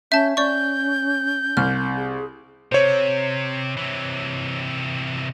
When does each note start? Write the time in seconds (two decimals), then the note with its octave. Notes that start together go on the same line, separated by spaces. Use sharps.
0.12 C#4 E5 A5 G6
0.37 C#4 D5 C#6 G6
1.57 C2 F6
1.97 G#4
2.72 C3 C5 C#5
3.77 C3 E3